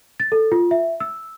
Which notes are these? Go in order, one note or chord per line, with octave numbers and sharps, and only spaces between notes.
A6
A4
F4
E5
E6